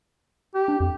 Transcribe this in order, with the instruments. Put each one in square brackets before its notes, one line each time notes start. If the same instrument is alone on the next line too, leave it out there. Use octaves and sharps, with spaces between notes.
[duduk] G4
[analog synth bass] D4
[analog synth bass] F2 [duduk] G4